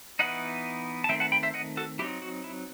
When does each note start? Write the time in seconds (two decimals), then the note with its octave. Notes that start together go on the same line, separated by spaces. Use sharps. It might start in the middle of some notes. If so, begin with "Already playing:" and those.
0.19 E3 B3 D#4 D#5 F#5
1.04 A5
1.09 D#3 A3 C4 E5 G5
1.20 F#5 A5
1.32 G5 B5
1.43 C5 E5
1.54 D#5 F#5
1.77 F#4 A4
1.99 F#3 C4 D#4 E4 G4
2.22 F#4
2.44 E4